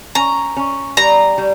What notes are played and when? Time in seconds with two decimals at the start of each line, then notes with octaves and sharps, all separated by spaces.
0.15 C#4 A#5
0.57 C#4
0.97 G3 A#5
1.38 G3